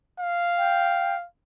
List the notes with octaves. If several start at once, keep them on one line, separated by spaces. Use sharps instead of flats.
F5
G5